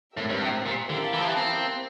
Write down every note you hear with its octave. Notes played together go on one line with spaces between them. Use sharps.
A2 C4 G4 A#4 E5
G2
A2
A#2
D3 E4 G4 A#4 F5 A5
E3
F3
E3
C4